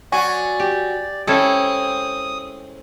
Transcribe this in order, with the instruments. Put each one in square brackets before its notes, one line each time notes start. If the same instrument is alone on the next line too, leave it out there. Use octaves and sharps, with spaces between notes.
[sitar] F#3 F#4 [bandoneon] D5 [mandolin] G#5 C#6
[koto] G4
[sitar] G#3 [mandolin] C4 [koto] C#4 E4 A4 [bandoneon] D#6